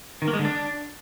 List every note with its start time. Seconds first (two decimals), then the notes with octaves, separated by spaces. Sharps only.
0.22 D#3
0.28 A#3
0.33 G#3
0.39 D3
0.45 D4